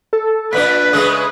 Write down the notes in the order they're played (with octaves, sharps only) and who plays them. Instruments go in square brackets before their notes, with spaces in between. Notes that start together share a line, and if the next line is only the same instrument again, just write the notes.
[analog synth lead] A4
[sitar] A#2 A3 D4 [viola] B4 [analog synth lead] B6
[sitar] C#3 G#3 A3 [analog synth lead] D#6